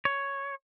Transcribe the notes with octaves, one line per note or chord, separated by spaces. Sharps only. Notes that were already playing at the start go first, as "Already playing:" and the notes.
C#5